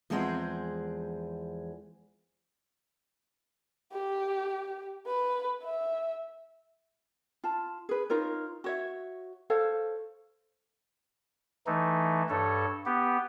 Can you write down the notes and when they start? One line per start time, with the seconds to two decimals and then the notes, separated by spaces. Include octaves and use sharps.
0.10 E2 F3 G#3 C4 G#4 F#5
3.93 G4
5.07 B4
5.63 E5
7.44 F4 A5
7.89 G#4 B4
8.10 D#4 F4 A#4 C#5
8.64 F#4 C#5 E5
9.50 A4 C5 C#5 F5
11.66 E3 A3 D#4
12.30 G2 A4 C#5
12.86 B3 G4